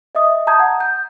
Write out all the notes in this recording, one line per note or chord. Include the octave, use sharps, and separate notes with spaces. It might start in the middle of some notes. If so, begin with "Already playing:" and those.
D#5 E5 D#6
A5 A#5 D#6 G6 G#6
F#5
G6